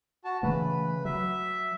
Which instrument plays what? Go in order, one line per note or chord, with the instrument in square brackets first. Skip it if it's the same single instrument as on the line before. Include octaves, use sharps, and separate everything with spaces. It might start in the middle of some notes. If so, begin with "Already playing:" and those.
[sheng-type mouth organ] F#4 A5
[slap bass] C#3 E3 A3 [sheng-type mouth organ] B4
[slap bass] F#3 [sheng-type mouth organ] E5